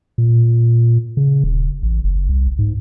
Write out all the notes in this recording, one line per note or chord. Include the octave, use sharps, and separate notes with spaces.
A#2
C#3
D#1
A1
F#1
C2
G#2